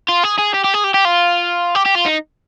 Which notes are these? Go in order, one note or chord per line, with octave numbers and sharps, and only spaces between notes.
F4
G#4
G#4
G4
G4
G#4
G4
G4
F4
G4
G4
F4
D#4